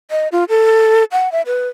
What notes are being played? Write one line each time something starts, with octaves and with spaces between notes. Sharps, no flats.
D#5
F4
A4
F#5
E5
B4